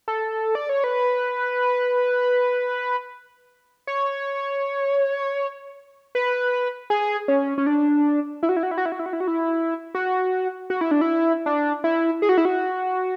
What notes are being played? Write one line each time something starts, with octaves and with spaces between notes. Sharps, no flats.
A4
D5
C#5
B4
C#5
B4
G#4
C#4
C#4
D4
E4
F#4
E4
F#4
E4
F#4
E4
F#4
E4
F#4
E4
F#4
E4
F#4
F#4
E4
D4
E4
D4
E4
G#4
F#4
E4
F#4